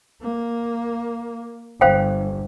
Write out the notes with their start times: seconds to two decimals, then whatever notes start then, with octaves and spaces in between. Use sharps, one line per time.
0.22 A#3
1.81 G1 C5 F5 G5